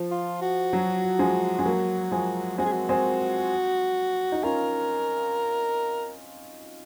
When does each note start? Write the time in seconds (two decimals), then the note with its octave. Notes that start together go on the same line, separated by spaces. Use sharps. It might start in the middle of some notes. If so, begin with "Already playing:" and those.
Already playing: F3
0.11 F4
0.42 F#4
0.73 F#3
1.19 F3 G#3
1.59 G#3
1.65 F#3 A#3
2.12 F3 G#3
2.58 G#3 C4 F#4
2.65 G#4
2.72 F#4
2.89 G#3 C4
4.32 D#4
4.43 C#4 F4 A#4